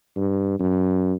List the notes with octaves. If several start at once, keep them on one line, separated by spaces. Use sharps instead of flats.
G2
F#2